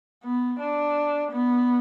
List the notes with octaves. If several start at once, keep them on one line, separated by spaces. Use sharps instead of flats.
B3
D4
B3